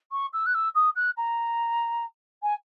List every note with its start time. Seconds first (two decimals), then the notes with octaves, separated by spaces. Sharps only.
0.11 C#6
0.33 E6
0.46 F#6
0.54 E6
0.75 D#6
0.95 F#6
1.17 A#5
2.42 G#5